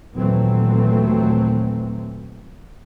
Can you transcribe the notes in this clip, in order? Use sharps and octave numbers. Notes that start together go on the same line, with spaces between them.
D#2 A#2 E3 F#3 A3 C4